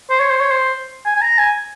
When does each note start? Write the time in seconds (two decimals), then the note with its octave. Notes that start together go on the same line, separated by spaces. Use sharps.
0.10 C5
0.20 C#5
0.30 C5
0.40 C#5
0.50 C5
1.06 G#5
1.16 G#5
1.21 A#5
1.38 G#5